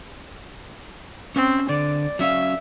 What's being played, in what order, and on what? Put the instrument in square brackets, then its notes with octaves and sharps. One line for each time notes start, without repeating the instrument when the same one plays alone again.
[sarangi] C4 [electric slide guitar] C#4
[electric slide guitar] D3 [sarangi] D5
[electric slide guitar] F#3 C#4 F5 [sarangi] E5